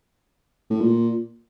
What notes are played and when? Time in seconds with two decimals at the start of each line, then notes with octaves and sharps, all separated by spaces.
0.70 A2
0.81 A#2